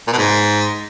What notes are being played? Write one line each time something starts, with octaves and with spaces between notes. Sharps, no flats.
A#2
B2
G#2